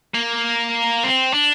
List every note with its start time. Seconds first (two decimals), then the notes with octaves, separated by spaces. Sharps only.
0.15 A#3
1.04 C4
1.34 D4